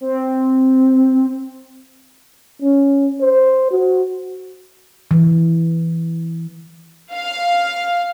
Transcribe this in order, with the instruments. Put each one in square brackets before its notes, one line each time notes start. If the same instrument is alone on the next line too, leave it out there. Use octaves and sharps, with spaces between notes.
[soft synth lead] C4
[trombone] C#4
C5
F#4
[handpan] E3
[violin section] F5